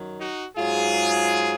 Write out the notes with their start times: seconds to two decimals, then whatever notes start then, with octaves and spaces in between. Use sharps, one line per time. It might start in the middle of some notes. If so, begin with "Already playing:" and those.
Already playing: F#2 D#3 F#3
0.19 D#4 F#4
0.56 G#2 F#3 F4 G#4